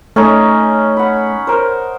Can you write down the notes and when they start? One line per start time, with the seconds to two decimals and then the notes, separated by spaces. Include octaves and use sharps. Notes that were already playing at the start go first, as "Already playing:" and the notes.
0.16 A3 C#4 D#4
0.97 F#5 B5
1.47 A#4 C5